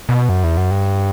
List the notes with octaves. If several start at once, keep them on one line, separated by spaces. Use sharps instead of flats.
B2
F#2
E2
F#2
G2